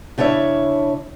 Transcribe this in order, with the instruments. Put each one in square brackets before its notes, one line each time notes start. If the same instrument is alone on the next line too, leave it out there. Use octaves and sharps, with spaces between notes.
[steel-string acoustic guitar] C#3 D4 E4 C#5 E5